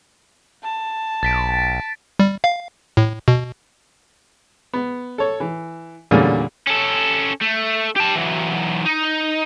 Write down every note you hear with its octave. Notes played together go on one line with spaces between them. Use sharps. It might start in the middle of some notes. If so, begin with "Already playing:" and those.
A5
B1 A6 B6 D7
G3
F5
A2
B2
B3
A4 C#5
E3
E2 A#2 D3 G3 A#3 C#4
C#4 A4
A3
G4 A5
E3 F#3
D#4